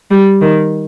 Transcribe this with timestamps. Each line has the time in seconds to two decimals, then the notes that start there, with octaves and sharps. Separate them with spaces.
0.11 G3
0.41 D#3